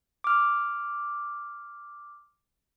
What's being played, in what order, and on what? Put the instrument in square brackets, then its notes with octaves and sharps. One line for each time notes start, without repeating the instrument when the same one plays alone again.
[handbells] D6 F6